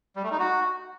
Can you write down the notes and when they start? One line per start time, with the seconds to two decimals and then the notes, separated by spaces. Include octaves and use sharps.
0.16 G3
0.24 A3
0.31 D#4
0.39 F#4